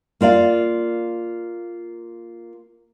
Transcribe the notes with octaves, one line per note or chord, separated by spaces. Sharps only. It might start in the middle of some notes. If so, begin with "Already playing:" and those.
A#3 F4 D5 F5